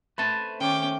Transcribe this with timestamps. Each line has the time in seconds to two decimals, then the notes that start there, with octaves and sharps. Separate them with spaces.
0.18 A3 C4 B4 A5
0.60 D#3 C#4 G5 D6